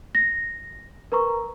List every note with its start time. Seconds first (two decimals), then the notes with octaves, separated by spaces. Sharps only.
0.15 A#6
1.12 A#4 B4 A#5 C#6